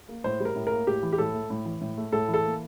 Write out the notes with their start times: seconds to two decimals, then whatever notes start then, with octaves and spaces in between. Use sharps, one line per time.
0.09 A#3
0.24 A2 C5
0.40 G3
0.45 A#4
0.56 A2
0.67 A#3 A#4
0.87 A2 G4
1.03 E3
1.12 G4
1.18 A2 A4
1.34 A3
1.50 A2
1.65 E3
1.81 A2
1.97 A3
2.12 A2 A4
2.28 E3
2.34 A4
2.44 A#3